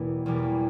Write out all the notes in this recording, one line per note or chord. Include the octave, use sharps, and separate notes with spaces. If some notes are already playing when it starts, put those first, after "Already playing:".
Already playing: E2 B2 G3 A#3
E2 B2 G3 A#3